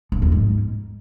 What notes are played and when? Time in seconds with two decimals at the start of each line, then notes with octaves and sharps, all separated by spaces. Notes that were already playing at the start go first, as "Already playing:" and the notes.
0.12 F3
0.22 E2
0.32 G#2